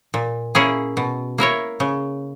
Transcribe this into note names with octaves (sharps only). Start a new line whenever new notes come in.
A#2
A#3 C#4 E4 G#4
B2
A#3 E4 A#4 C#5
C#3